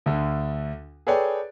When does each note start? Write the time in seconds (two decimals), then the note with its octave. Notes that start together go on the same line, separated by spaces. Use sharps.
0.06 D2 D3
1.07 G#4 A4 B4 C#5 D5 G5